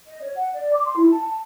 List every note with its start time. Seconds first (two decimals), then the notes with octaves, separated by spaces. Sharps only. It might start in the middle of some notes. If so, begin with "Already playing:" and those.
0.06 D#5
0.21 C#5
0.36 F#5
0.53 D5
0.73 D6
0.85 C6
0.97 E4
1.09 A5
1.26 A5